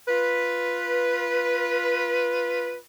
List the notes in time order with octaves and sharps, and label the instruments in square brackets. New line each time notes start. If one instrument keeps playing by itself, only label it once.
[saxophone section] F4 B4